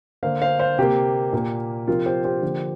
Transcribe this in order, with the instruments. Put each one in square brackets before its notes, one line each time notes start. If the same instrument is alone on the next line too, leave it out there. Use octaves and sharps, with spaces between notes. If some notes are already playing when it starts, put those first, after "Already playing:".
[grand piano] D3 A#3 C5 F5
C5 F5
C5 F5
C3 A#3 G4
A#2 A#3
C3 F3 C4 F4 A#4
G4 C5
G4 C5
D3 F3 A#3